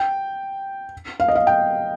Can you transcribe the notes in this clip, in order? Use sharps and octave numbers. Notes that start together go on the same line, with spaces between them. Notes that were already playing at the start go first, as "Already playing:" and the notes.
Already playing: G5
F5
D#5
F5
G5